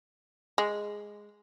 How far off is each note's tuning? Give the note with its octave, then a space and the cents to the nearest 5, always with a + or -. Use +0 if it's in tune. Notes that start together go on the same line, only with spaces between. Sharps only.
G#3 -5